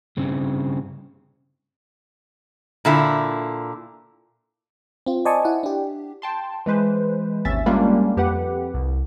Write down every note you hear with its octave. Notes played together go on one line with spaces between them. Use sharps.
G2 C#3 C4
A#2 D3 E4
C4 F4
C5 D5 D#5 G#5 A5 C#6
E4 F#5
D4 G4
G5 A5 C6
E3 G#3 B4 C5
G#1 D#2 C#4 E5 A6
G3 G#3 A#3 C#4 D4 F4
F2 G4 B4 F#5
C2